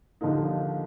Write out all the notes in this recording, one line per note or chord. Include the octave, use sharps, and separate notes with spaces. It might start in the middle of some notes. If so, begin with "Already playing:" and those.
D#2 D3 F3 A#3 D#4